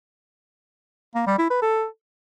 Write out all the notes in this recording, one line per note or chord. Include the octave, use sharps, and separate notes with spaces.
A#3
G3
E4
B4
A4